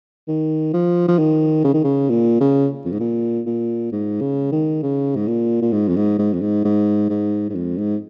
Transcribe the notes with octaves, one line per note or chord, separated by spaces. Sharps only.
D#3
F3
F3
D#3
C#3
D#3
C#3
A#2
C#3
F2
G#2
A#2
A#2
G#2
C#3
D#3
C#3
G#2
A#2
A#2
G#2
F2
G#2
G#2
F2
G#2
G#2
G#2
G#2
F2
G#2